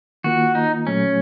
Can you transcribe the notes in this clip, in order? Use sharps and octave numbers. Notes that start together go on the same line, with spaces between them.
D#3 A#3 F4 F#4
D#4
A#2 F#3 A3 C#4